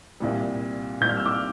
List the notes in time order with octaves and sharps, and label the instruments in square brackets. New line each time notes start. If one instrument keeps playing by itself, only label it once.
[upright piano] C2 A#2 G3
C2 A#2 G3 G6
F6
E6
D6 F6